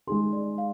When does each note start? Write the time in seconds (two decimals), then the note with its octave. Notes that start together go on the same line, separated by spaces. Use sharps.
0.07 G#3 D#4 G#4 C6
0.33 D5
0.58 F5